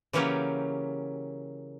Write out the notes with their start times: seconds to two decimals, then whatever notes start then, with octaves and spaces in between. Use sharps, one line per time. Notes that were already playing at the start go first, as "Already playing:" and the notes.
0.13 C#3 E3 F#3 A#3 C#4 G4